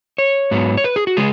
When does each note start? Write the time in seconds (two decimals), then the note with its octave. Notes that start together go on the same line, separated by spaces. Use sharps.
0.18 C#5
0.51 G#2 F#3 B3
0.77 C#5
0.84 B4
0.96 G#4
1.07 F#4
1.17 C#3 G#3 G#4